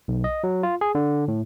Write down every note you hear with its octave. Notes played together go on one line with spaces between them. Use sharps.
B1
D#5
F#3
F4
G#4
D3
A2